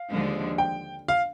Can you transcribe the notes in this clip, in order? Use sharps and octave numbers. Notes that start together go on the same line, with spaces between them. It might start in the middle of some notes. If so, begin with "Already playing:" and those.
Already playing: F5
D#2 D3 F3 G#3
G5
F5